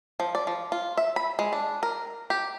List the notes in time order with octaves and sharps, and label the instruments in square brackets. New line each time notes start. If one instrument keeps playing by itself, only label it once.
[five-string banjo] F3
D5
F3
F4
E5
B5
G#3
D4
A#4
G4